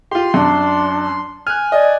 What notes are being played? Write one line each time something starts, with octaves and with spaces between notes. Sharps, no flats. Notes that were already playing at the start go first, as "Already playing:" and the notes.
F4 G4 C6
F#2 D4
G#5 F6 F#6
D5 D#5